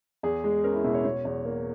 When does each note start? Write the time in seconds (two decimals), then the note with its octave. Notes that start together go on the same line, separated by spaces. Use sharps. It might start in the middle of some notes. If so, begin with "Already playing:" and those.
0.23 E2 G#4
0.44 G#3
0.64 C#4 A#4
0.74 E4
0.84 B2 E4
0.94 C#5
1.05 B2 C#5
1.25 E2
1.45 A#3